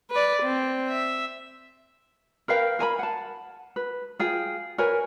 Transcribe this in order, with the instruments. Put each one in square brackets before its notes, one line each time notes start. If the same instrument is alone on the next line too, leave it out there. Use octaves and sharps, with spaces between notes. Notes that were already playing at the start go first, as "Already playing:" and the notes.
[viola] B4 D5
C4
E5
[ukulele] A#4 B4 F5 G5
A#4 G#5 A#5 B5
F#5 A5
B4
F4 G#4 G5
A#4 B4 C#5 G#5